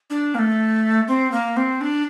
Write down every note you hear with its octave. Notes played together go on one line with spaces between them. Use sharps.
D4
A#3
A3
C4
A#3
C4
D4